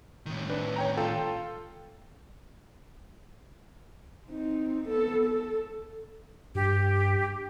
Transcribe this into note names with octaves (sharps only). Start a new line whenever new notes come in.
A2 D#3
D4 B4
C#5 G5 A#5
F4 A4 G5
C4 D#4
B3 A4
A4
G2 G4